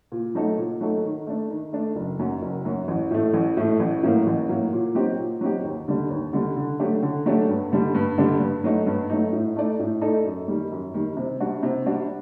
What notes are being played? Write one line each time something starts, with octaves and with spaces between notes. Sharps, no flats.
A#2
F#3 A3 D#4 A4
A#2
F#3 A3 D#4 A4
D#3
A3 D4
D#3
A3 D4
F#1
F#2 F#3
F#1
F#2 F#3
A1
A2 A3
A1
A2 A3
A1
A2 F#3 A#3
A1
A2 F#3 A#3
A#2
F#3 C4 D#4 G4
A#2
F#3 C4 D#4 G4
D#2
D3 G3 D4
D#2
D3 G3 D4
D3
F#3 A3 D4 G4
D3
F#3 A3 D4 G4
G2
D3 G3 D4
G2
D3 G3 D4
G2
F#3 A3 D#4
G2
F#3 A3 D#4
A2
A3 D#4 A4 D5
A2
A3 D#4 A4 D5
F#2
D#3 G3
F#2
D#3 G3
C3
G3 D4 F#4
C3
G3 D4 F#4